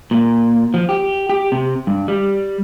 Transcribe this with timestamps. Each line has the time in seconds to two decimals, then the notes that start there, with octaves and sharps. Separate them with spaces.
0.11 A#2
0.74 F3
0.89 G4
1.29 G4
1.52 C3
1.87 G2
2.08 G3